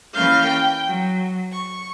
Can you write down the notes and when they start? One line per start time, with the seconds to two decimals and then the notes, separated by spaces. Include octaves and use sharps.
0.15 E3 A#3 C#4 F5 F6 G6
0.47 G5
0.88 F#3
1.52 C#6